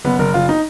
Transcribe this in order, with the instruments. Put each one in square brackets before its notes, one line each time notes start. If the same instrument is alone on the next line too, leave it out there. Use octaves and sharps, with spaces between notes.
[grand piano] F#1 B3
F#1 A#4
F#1 F4
D#4